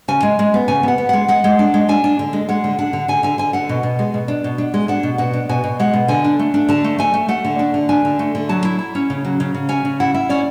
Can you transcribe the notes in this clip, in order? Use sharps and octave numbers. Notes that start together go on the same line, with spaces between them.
C#3 G#5
G#3
G#3
B3
C#3 G#5
B3 F#5
B3
G#3 F#5
G#3 F#5
G#3
D4
G#3
D4 G#5
D4
D3
G#3
G#3 F#5
D3
D4 F#5
D3
D3 G#5
D3 G#5
D3 G#5
D3 F#5
B2
B2
G#3
B2
D4
B2
D4
G#3
D4 F#5
B2
B2 F#5
D4
B2 G#5
B2
G#3 F#5
B2
D3 G#5
D4
A3
D4
D3 A5
A3
A3 G#5
A3
A3 F#5
D3
D4
D3
D4 G#5
D3
A3
D3
F#3 A5
E4
E4
C#4
C#3
F#3
C#3
C#3
C#4 G#5
C#3
E4 F#5
E4
C#4 D5